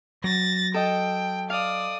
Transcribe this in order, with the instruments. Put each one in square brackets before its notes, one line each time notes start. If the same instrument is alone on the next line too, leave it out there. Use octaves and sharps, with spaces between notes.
[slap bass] F#3 [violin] A6 A#6
[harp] A4 D#5 [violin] G5
[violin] D5 D#6 [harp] F5